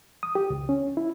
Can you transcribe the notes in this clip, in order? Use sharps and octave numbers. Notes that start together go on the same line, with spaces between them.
D#6
G4
C#2
C#4
E4